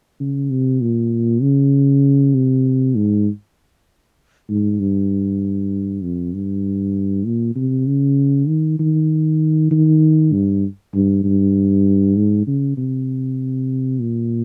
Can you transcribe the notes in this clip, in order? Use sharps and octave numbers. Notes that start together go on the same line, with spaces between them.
C#3
C3
A#2
C#3
C3
G#2
G#2
G2
F2
G2
A#2
C3
C#3
D#3
D#3
D#3
G2
G2
G2
G#2
C#3
C3
A#2